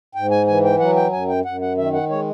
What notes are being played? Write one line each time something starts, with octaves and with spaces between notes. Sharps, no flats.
G#2 G5
G#5
E3 G#5
G5
F#3 F#5
G5
F#2 G#5
G5
F#2 F#5
F#5
D#3 E5
F#5
G#3 C#5